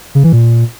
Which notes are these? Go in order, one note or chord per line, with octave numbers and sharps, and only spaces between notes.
C#3
E3
A#2